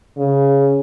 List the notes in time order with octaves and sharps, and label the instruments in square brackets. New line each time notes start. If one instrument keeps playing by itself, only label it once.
[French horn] C#3